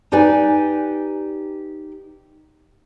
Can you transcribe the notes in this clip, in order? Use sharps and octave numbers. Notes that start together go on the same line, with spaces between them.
D#4 G4 B4 D5 G#5